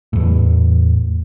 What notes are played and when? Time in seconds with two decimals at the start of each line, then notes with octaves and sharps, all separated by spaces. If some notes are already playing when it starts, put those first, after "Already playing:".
0.13 E2 A2